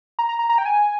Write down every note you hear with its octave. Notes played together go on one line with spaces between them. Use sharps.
A#5
A#5
A#5
A#5
G5
G#5